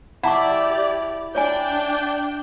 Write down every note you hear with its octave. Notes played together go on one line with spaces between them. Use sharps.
E4 G4 D5 F#5 A5 C#6
D4 C#5 D5 G5 G#5